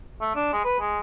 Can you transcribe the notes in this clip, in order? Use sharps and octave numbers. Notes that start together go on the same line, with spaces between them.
A3
D4
G#3
B4
G#3